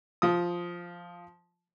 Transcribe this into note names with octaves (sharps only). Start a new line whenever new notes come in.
F3 D#6